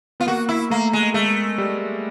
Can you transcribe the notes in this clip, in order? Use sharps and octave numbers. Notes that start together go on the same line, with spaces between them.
B3 F4
A#3 F#4
E4
A3 A#3
G#3
G#3 A3
G3